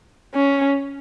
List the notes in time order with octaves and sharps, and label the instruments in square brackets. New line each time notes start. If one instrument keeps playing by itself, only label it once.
[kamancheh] C#4